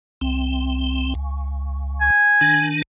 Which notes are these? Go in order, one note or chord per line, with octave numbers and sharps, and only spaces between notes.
C2 C4
C#2
G#5
D#3 D4